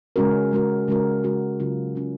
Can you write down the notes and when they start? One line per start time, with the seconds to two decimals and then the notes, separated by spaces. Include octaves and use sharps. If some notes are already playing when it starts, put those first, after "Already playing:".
0.16 C#3 G#3 C#4 F#4 A#4
0.51 C#3 G#3 C#4 F#4 A#4
0.88 C#3 G#3 C#4 F#4 A#4
1.23 C#3 G#3 C#4 F#4 A#4
1.60 C#3 F#3 C#4 F4
1.96 C#3 F#3 C#4 F4